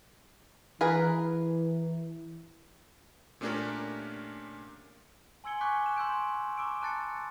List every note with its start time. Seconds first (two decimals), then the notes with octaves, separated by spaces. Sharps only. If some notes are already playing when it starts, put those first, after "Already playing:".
0.81 E3 G#4 A#4 B4
3.41 A#2 A3 C#4 D4 G4 A#4
5.44 G#5 C6 E6 G#6 C#7 G7
5.61 G#5 C#6 D6 F#6 G6 B6
5.83 F#6 E7
5.96 C6 E6 G6 D7
6.58 A#5 C#6 D6 E6 D7
6.82 A5 F#6 A6 C#7